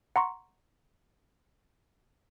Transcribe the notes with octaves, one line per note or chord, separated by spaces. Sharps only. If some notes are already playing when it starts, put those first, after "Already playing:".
F#5 A#5 C6 C#6